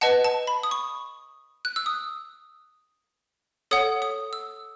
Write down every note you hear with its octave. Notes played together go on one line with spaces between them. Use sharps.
B4 D#5 F#5 A5
A5
B5
D#6
C#6
F#6
E6
D#6
A4 C#5 F#5 D#6
D#6
E6